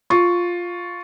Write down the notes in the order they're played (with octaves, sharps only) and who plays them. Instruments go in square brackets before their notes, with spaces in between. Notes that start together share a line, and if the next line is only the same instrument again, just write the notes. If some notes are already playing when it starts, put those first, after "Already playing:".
[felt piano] F4 C#6